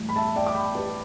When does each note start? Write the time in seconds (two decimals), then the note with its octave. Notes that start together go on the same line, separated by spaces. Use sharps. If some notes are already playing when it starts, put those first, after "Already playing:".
Already playing: A1 G3
0.09 B5
0.16 E5 A5
0.36 D5 G5
0.47 D6
0.55 G5 B5
0.75 G4 B4